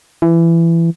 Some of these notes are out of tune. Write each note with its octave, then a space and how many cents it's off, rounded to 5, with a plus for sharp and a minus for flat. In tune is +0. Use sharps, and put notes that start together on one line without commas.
E3 +20